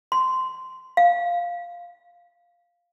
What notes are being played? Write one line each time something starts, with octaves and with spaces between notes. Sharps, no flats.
C6
F5